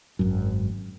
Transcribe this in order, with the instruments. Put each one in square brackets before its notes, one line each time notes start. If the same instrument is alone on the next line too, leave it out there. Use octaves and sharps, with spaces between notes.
[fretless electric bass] G#1 F#2